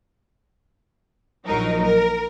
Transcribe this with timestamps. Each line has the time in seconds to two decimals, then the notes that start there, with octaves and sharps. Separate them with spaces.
1.47 A#1 F#3 D#4 A#4
1.84 A#4